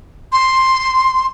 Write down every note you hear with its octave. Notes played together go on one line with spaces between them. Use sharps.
C6